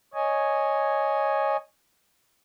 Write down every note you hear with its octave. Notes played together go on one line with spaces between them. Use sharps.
C#5 D#5 G#5